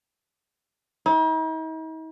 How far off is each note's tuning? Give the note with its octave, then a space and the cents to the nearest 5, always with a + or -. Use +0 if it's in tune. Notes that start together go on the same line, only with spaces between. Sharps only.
D#4 +45